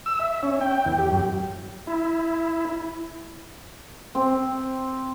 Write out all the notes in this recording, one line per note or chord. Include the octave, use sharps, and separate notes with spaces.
E6
E5
C#4
G5
E2
G4
F#2
E4
C4